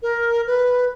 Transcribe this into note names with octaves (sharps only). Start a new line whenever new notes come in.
A#4
B4